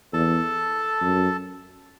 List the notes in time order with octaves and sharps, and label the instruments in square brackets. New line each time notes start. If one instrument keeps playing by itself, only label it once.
[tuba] E2 [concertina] A4 A5
[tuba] F#2